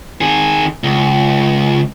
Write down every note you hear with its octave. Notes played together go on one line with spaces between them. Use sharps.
D#3 G#4
C#2